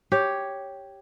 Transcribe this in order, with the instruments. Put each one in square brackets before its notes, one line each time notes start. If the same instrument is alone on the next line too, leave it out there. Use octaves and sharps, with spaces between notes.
[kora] G4 C#5